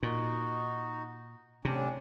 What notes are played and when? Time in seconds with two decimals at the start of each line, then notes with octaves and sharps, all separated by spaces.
0.03 A#2 D#4 F#4
1.65 A2 C3 C#4 D4